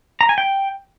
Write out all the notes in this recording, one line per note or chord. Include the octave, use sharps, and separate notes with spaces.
A#5
G#5
G5